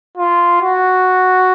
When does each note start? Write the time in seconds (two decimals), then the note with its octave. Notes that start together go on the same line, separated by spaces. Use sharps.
0.18 F4
0.62 F#4